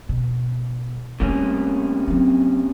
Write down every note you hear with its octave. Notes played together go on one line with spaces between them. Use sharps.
B2
C3 G3 A3 A#3 C#4
F#3 C4